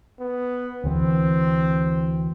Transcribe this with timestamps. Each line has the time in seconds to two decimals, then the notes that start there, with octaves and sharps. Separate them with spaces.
0.20 B3
0.84 D2 E3 C4